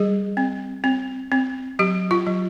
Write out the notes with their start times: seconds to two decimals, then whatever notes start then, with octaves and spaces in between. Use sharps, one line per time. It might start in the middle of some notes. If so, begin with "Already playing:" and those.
Already playing: G3 G#4
0.37 C4
0.84 C4
1.32 C4
1.79 F#3 G4
2.11 F4
2.27 F#3